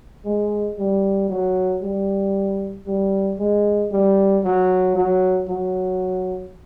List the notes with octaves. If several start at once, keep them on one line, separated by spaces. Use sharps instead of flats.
G#3
G3
F#3
G3
G3
G#3
G3
F#3
F#3
F#3